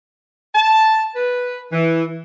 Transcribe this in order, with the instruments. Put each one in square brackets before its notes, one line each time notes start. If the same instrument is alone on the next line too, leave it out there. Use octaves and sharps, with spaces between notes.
[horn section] A5
B4
E3